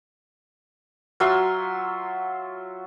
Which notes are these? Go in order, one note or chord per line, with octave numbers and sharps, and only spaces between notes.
F#3 F4 E5 C6